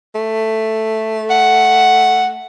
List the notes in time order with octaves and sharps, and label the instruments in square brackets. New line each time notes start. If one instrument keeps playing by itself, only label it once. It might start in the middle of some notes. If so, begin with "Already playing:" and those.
[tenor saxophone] A3
[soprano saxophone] F#5